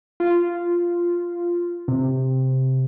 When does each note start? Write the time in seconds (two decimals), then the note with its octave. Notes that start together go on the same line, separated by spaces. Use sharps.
0.20 F4
1.88 C3